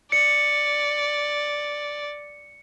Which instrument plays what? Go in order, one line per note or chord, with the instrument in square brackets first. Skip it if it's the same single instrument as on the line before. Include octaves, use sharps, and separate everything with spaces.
[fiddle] D5 [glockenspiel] C#7